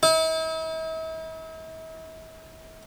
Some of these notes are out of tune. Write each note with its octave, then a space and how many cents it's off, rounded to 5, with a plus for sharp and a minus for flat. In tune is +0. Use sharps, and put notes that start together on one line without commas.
E4 -45